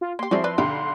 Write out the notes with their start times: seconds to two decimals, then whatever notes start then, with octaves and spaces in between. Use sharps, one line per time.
0.01 F4
0.19 A#3 G4 C6
0.31 F3 C4 E4 F#4 G#4 D5
0.44 B4 D5
0.58 B1 D3 G4 B5